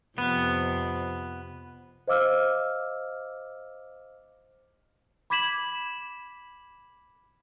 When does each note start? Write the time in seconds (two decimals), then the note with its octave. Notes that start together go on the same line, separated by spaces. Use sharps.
0.18 F2 C3 B3
2.08 C5 D#5 F5 D6 E6 F6
5.30 B5 D6 G#6 B6 E7 F#7